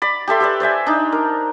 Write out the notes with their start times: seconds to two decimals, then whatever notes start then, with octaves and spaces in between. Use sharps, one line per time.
0.02 D5 B5
0.27 G4 A4 E5 C6
0.40 G4 B4 D5
0.60 C5 D5 E5 G#5
0.86 D4 D#4
1.12 A#4